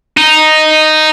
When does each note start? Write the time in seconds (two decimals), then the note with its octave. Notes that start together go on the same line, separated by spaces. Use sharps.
0.17 D#4